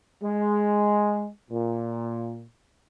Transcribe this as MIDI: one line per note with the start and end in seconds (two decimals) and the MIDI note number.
0.23 1.27 56
1.50 2.45 46